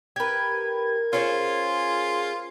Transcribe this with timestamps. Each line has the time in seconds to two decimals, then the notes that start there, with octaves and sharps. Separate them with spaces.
0.16 G4 A#4 B4 G#6
1.13 C#4 F4 G#4 C5